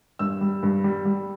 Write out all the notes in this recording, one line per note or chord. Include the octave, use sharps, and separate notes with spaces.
G2 E6
G3
G2
G3
G3